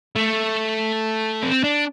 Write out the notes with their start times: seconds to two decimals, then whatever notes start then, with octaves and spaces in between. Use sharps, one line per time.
0.16 A3
1.42 C4
1.64 D4